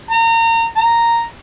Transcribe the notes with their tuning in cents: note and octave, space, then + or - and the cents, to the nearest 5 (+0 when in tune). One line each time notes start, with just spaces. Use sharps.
A#5 -30
A#5 -5